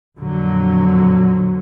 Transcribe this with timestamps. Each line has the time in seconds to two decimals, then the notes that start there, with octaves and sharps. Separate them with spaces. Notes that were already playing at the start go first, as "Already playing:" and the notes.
0.18 F2 A#2 D3 F#3